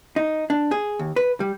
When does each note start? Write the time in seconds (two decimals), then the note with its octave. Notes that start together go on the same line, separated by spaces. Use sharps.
0.16 D#4
0.50 D4
0.71 G#4
0.99 D#2
1.16 B4
1.40 G3